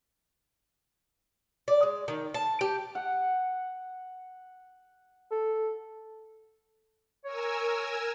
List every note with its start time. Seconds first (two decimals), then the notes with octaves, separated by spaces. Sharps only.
1.68 D5
1.83 G#3
2.08 D#3
2.34 A5
2.61 G4
2.95 F#5
5.31 A4
7.25 A#4 C#5 G#5 E6